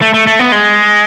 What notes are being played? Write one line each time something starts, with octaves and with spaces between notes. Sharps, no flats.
A3
A3
A3
B3
G#3